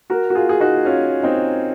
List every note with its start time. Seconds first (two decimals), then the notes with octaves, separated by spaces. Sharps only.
0.10 F#4 A#4
0.30 F#4
0.35 F4 G#4
0.49 G#4
0.60 D#4 F#4
0.85 C#4 F4
1.23 C4 D#4